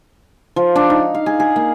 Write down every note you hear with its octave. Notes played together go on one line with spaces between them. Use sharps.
F3
D4
D#4
F5
G#4
G#4
A#3